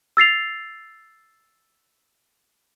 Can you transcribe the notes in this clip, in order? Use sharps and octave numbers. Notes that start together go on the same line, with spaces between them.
E6 A6 C7 F7